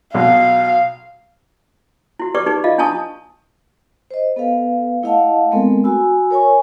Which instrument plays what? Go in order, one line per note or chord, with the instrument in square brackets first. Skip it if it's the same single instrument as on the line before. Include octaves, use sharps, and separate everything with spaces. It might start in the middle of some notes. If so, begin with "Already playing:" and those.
[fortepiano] B1 B2 F#3 [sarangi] F5
[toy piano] E4 F#4
G4 B4 D5 C#6 D6
D#4 G4 G#4 B4 C#6
F4 D#5 F5
D4 E4 G#5 A5 C#6 D#6
[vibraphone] C5 D#5
B3 A4 B4 F5
A3 E4 D#5 F5 F#5 A5
G#3 A3 B3 C4 A4 A#4
F#4 G#5 B5 E6
A#4 C#5 G#5 C#6